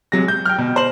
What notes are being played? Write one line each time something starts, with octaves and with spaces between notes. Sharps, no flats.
C3 F#3 G#3 A#6
G6
G5 F6
B2
C5 F#7